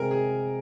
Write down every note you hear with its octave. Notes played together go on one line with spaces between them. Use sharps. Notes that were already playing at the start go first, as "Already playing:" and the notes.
Already playing: C3 G#3 C4 G#4 A#4
G#4